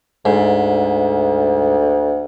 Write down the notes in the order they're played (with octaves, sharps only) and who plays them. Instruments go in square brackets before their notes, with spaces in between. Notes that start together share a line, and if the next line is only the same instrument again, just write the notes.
[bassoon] D2 [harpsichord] G#2